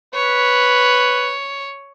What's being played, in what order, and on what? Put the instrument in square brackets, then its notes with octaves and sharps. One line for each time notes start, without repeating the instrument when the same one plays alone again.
[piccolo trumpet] B4 [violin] C#5